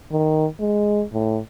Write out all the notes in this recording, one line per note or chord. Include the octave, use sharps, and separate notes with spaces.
D#3
G#3
A2